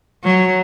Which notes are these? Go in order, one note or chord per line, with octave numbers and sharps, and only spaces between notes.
F#3